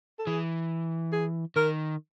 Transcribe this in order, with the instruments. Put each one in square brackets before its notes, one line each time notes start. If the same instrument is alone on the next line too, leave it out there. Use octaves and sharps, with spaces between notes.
[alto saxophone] A4
[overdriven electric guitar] E3 [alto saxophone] G#4
[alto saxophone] G#4
[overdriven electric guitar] D#3 [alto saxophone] A#4